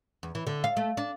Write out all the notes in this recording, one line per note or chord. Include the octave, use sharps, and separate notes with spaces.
E2
E3
D3
F5
A3
D4